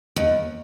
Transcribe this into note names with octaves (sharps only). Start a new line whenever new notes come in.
D#2